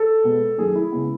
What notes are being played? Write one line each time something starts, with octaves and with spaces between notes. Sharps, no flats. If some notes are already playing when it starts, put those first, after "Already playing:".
Already playing: A4
B2 G#3 B3
F#2 D#3 A3 G#4
E4
C#3 G#3 B3